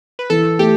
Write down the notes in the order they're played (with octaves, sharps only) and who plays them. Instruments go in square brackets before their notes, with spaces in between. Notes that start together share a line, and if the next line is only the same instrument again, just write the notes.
[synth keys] B4
[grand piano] E3 [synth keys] A4
[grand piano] A3 [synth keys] G4